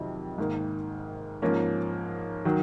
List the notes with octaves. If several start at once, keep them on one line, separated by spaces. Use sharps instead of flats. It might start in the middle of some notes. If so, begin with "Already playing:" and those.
Already playing: F2 C3 D#3 F#3
G#2 D#3 A#3
G#2 F3 A#3 C#4
D#3 F#3